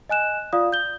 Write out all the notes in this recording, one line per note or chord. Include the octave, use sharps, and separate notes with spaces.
D#5 G#5 F#6 E7
F4 D5 F5 D#6
G6 G7